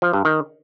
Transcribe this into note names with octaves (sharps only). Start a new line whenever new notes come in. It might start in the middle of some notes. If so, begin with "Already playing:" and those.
F3
G2
D#3